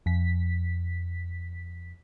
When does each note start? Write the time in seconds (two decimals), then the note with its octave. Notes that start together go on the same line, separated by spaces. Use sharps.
0.06 F2 B6